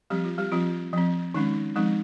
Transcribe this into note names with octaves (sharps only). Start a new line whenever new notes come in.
F3 G3 C4 G4
F4
G3 G4
F3 C4 F4
F3 C4
D#3 G#3 C#4 D#4
F3 G#3 C4 D#4